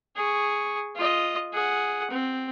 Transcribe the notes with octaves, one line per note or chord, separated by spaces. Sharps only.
G#4 C#6
F4 D#5
G#4 F#5
C4